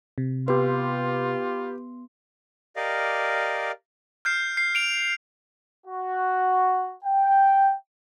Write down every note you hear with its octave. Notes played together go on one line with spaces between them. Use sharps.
C3
B3 F4 G4 B4 C6
G4 A#4 D5 D#5 F5
F6 G6 C7
C7
D7 F7
F#4
G5